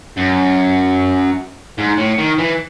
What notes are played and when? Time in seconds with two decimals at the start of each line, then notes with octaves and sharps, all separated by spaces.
0.17 F#2
1.78 G#2
1.97 A2
2.18 D#3
2.38 E3